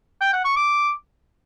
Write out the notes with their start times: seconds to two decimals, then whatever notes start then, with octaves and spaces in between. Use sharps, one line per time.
0.21 G5
0.33 F#5
0.45 C#6
0.56 D6